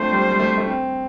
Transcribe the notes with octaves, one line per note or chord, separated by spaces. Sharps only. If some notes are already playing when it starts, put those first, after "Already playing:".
Already playing: A3 C4 D4 F4 C5
G3
G3
A3
A3
C4